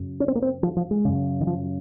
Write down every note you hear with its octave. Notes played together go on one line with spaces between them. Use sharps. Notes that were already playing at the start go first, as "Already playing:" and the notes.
Already playing: F#2 C#3
C#4
C4
A#3
C4
F3
F3
G#3
F#2 C#3
D#3
F3